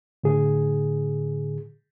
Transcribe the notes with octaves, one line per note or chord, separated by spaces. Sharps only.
A2 D3 G#4